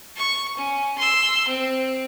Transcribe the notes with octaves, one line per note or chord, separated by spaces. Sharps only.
C#6
C#4
C6 E6
C4